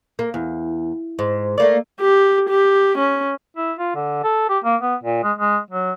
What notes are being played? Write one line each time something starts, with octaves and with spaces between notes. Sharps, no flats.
A#3
E2
G#2
A3 A#3 D5
G4
G4
C#4
E4
F4
D3
A4
G4
A#3
B3
A#2
G#3
G#3
F#3